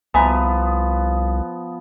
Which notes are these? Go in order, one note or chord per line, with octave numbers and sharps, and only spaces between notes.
C2 F3 B3 E5 G#5 A#5